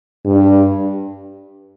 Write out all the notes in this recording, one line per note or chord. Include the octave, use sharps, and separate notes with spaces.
G2